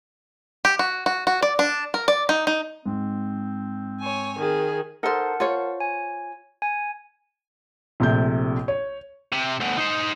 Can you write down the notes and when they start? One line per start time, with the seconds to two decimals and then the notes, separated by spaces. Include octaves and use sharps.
0.65 G4
0.79 F#4
1.06 F#4
1.27 F#4
1.43 D5
1.59 D4
1.94 A#4
2.08 D5
2.29 D#4
2.47 D#4
2.86 G#2 C4
4.00 C#5 G#5
4.39 D#3 G#4
5.03 D#4 A4 A#4 C5 F#5 A5
5.40 F4 C5 C#5
5.80 G#5
6.62 G#5
8.00 A#1 C3 A3 G6
8.68 C#5
9.33 C3
9.61 D2 B2
9.78 D#4 C5